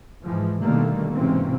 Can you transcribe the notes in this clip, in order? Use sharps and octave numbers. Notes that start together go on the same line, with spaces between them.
G#2 E3 F3
B2 D3 D#3 G3 A3 A#3
G#1 C3 E3 A#3 C4 C#4